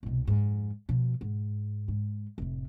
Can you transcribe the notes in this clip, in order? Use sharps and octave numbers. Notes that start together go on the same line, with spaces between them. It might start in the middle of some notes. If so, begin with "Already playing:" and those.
C2 B2
F2 G#2
B2 F3
G#2
G#2
F1 A2